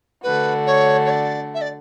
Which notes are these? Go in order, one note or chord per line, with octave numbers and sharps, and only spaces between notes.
D3 A3 D4 F#4 B4
C#5
C#5
D5
E5
D5